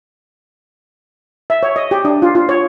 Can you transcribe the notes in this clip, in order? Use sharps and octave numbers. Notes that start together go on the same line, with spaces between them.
E5
C#5
D#5
G4
D4
F4
F4
C#5